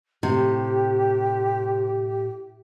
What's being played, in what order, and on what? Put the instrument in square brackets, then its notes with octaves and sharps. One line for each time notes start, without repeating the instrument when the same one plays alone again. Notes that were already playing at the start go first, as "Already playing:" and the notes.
[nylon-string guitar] A2 [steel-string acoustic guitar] C3 [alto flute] G4